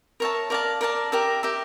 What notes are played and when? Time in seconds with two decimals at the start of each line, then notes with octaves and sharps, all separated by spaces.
0.20 A#4 C#5 E5 A5
0.50 A#4 D5 F5 A5
0.81 A#4 D5 F5 A5
1.12 G4 A#4 E5
1.43 G4 A#4 E5